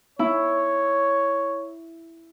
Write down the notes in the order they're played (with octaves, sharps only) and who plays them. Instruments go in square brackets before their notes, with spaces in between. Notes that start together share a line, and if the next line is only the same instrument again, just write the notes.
[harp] E4 [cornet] C#5